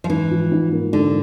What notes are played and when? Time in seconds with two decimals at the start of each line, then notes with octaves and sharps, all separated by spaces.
0.04 F3
0.09 G#2 E3
0.31 F3
0.52 G#2
0.72 A#3
0.92 G#2 D3